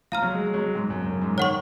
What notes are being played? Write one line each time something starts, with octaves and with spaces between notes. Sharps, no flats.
F3 F5 A#5 F6
F#3
G#3
G#3
F#3
G#2
F#2
F#2
G#2
D#3 C#5 F#5 C#6